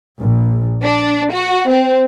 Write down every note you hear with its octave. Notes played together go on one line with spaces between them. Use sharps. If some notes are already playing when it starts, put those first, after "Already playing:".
A#1
D4
F#4
C4